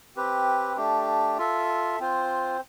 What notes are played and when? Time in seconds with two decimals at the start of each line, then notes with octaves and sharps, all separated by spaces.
0.16 C4 G4 B4
0.77 A3 D4 G4
1.38 F4 A4 E5
2.00 C4 F4 C5